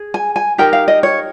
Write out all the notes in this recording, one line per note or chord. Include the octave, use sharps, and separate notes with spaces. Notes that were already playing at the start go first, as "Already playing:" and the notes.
Already playing: G#4
G#5
G#5
D#4 G4 A#4 G5
F5
D#5
C#5